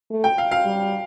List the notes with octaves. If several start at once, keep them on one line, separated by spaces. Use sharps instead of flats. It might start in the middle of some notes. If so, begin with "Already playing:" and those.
A3
G5
F5
F5
G3